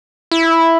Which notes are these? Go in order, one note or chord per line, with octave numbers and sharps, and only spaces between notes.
E4